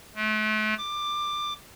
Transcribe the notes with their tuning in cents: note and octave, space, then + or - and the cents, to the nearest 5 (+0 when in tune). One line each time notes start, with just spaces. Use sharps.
A3 -40
D6 +15